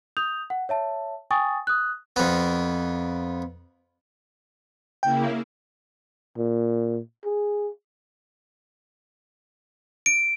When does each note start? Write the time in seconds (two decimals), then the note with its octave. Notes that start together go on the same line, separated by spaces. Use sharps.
0.17 D#6 G6 F7
0.50 F#5
0.69 C#5 E5 A5
1.31 G5 G#5 C#6 D#6 A6
1.67 D#6 F#6
2.16 F2 B3
5.03 C#3 A#3 E4 G5
6.38 A#2
7.24 G#4
10.06 D7